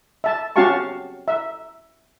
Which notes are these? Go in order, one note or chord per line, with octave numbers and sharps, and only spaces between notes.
E5 A5
C#4 F#4 G4 F5 A5 C#6
E5